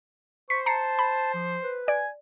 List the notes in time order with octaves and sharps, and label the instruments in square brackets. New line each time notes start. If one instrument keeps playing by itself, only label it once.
[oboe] C5 [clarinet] C#6 [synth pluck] B6
[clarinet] A5 [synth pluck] A#5 C7 C#7
[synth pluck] B5
[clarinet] F3
B4
[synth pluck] D5 [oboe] G#5